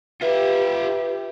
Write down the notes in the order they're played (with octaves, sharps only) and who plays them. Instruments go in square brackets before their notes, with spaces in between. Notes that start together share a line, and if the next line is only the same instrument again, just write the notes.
[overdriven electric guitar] F4 E5 [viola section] G4 [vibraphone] B4